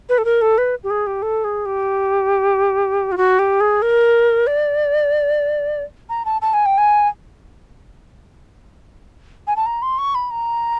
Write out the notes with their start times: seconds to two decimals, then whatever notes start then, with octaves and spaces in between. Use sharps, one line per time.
0.09 B4
0.18 A4
0.25 A#4
0.42 A4
0.58 B4
0.84 G4
0.90 G#4
1.07 G4
1.22 A4
1.44 G#4
1.66 G4
3.12 F4
3.17 F#4
3.39 G4
3.60 G#4
3.82 A#4
4.47 D5
6.09 A#5
6.25 A5
6.42 A5
6.54 G#5
6.66 G5
6.78 G#5
9.47 G#5
9.56 A5
9.66 A#5
9.82 C6
9.98 C#6
10.15 B5
10.31 A#5